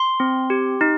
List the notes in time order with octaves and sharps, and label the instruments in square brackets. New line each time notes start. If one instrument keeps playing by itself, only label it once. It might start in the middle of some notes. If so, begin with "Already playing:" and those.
Already playing: [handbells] C6
C4
G4
D#4